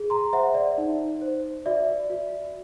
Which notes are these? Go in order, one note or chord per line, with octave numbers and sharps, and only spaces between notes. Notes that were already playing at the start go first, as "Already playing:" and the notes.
Already playing: G#4
A#5 C6
C5 E5 F#5
D5 E5
D#4
C5
F#4 D5 E5
F#4